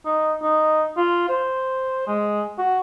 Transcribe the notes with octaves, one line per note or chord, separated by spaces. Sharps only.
D#4
D#4
F4
C5
G#3
F#4